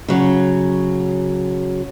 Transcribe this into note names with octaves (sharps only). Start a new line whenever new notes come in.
C#3 F#3